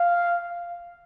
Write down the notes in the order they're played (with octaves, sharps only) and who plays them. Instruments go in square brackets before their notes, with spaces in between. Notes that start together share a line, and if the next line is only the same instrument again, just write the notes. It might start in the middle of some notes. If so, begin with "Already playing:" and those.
Already playing: [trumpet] F5